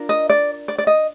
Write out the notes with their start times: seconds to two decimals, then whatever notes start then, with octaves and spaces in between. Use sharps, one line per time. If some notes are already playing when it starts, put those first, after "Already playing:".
Already playing: D4 F4 A#4
0.09 D#5
0.30 D5
0.68 D5
0.78 D5
0.87 D#5